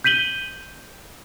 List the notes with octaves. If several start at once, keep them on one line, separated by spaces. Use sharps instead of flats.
G6 B6 D#7 F#7 G7